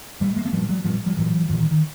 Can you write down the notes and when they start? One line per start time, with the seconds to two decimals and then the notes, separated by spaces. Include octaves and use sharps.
0.20 A#2 G3 A3
0.36 G#3 A#3
0.45 A3 B3
0.52 A#2 F3 G3
0.69 F#3 G#3
0.84 A#2 F3 G3
1.06 F3 G3
1.17 A#2 E3 F#3
1.48 A#2 D#3 F3
1.59 D#3
1.71 D#3